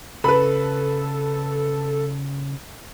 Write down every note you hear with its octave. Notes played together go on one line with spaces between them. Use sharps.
C#3 A4 B4 B5